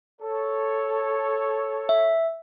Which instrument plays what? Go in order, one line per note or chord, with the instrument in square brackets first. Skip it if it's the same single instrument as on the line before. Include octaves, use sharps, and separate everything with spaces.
[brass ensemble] A4 C#5
[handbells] E5